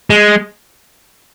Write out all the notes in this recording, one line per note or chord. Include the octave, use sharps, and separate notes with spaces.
G#3